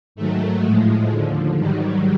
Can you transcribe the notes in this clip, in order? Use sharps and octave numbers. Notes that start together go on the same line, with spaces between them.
G#2 D#3 F#3 A3
A2 F3 G#3
D#2 D3 F3
G#2 D#3 F#3 G3